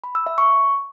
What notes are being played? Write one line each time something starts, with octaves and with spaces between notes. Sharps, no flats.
B5
E6
E5
C#6